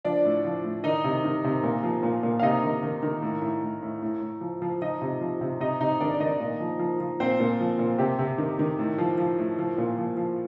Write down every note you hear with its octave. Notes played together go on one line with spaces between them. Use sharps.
F3 D4 D5
A2
F3
A2
D#3 D#4 D#5
C3
D#3
C3
A#2
F3
A#2
A#2
F5
C3 D#4 D#5
D#3
D#3
D#3
A2
A2
A2
A2
A2
A2
F3
F3
F3 D#4 D#5
C3
F3
C3
C3 D#4 D#5
C3 D#4 D#5
D#3 D4 D5
D5
D#3 D#4 D#5
A#2
F3
F3
F3
A#2 C4 C5
A#2
F3
A#2
C3 G4
C3
D#3
D#3
A2
F3
F3
A2
F3
A#2
F3
F3